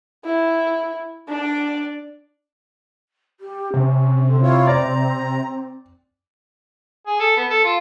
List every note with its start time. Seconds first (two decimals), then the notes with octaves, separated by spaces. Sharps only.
0.25 E4
1.28 D4 D5
3.40 G4
3.74 C3 C#4
4.27 D3 C4
4.42 E4 F4 C#5
4.67 D5 A#5
7.06 G#4
7.20 A4
7.36 B3
7.50 A4
7.64 F4